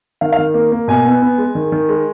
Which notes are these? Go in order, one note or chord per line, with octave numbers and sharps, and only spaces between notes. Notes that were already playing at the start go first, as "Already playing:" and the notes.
D#3 F5
F5
D#3
A#3
A#3
B2 G#5
B3
B3
G#3
D#3
D#3
G#3